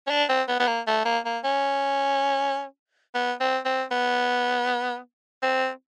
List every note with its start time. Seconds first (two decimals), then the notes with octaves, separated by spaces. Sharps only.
0.07 C#4
0.10 D4
0.29 C4
0.48 B3
0.60 B3
0.67 A#3
0.87 A3
1.05 A#3
1.25 A#3
1.44 C#4
3.15 B3
3.40 C4
3.65 C4
3.91 B3
5.42 C4